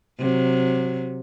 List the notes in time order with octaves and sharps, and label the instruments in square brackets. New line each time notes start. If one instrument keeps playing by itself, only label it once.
[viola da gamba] C3 F#3